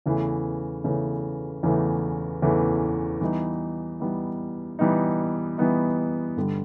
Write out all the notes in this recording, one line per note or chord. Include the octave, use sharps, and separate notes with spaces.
E2 C#3 E3 A3
E2 C#3 E3 A3
E2 C#3 E3 A3
E2 C#3 E3 A3
E3 G3 B3 D#4
E3 G3 B3 D#4
E3 G3 B3 D#4
E3 G3 B3 D#4
G2 D3 G3